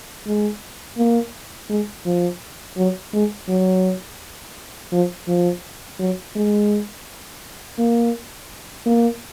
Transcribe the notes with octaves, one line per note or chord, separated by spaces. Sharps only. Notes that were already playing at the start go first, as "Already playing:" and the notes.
G#3
A#3
G#3
F3
F#3
G#3
F#3
F3
F3
F#3
G#3
A#3
A#3